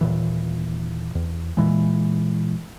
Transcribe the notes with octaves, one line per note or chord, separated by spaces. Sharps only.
D#1 A#2 E3
E2
A#2 E3 G#3